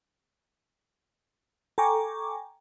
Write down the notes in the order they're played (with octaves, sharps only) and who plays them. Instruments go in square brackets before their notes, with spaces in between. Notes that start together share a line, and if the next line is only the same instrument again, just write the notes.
[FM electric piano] A4 G5 G#5 A#5 C#6 D6